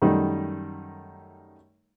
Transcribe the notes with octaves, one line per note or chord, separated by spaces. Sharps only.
F#2 D#3 G3 A3 D#4